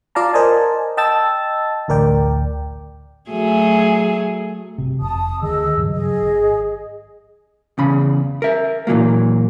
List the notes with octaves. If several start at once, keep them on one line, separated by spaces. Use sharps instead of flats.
F4 D5 F5 A5 A#5
A#4 C5 D5 D#5 G#5 A5
D#5 G5 A5 E6 A6
A1 D2 A#4 D5 G5
F#3 A3 G#4
G1 C3
F1 A5 D#6
D2 D#3 G#4 D#5 E6
G2 C#3 F#3
G#4 D#5
G#1
E2 C#3 B5
A#4 E5
A#2 E3 F#3 A#3